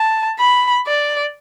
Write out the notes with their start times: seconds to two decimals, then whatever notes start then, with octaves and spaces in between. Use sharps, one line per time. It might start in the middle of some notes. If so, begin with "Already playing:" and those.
Already playing: A5
0.39 B5
0.87 D5